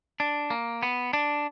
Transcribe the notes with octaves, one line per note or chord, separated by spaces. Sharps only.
D4
A#3
B3
D4